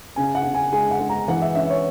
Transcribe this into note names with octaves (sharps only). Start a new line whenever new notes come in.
C#3 G#5
F#5
C#3
G#5
G#3 G#5
F#5
G#3
A#5
E3 F#5
E5
C#4 E5
C#5